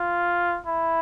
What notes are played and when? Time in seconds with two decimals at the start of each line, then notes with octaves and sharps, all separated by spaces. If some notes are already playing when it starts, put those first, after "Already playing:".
Already playing: F4
0.66 E4